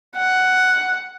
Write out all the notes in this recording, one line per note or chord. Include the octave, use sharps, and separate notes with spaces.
F#5